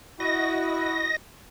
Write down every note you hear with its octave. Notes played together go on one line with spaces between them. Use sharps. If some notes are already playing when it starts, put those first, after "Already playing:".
E4 F#4 D#5 A#6